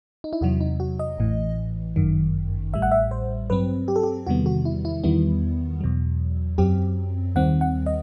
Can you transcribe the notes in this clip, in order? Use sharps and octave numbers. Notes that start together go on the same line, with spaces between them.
D#4
E4
E2 C3 F#3 F#4
D#4
F#4
D#5
A1 A2 E3
G1 F#2 D#3
A1 A2 G3 E5
F#5
E5
C5
G2 F#3 C4 B4
G4
A4
G4
E2 C3 D#3 G3 B3 F#4
F#4
E4
E4
E2 D#3 G3 B3 E4
E2 B2 F#3
F#2 F#3 C4 G4
D#2 D#3 G3 C4 F#5
F#5
D#5